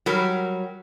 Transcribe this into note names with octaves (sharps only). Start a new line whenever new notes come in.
F#3 G3 A#4